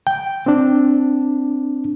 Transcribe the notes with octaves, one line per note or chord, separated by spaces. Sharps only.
G5
C4 D4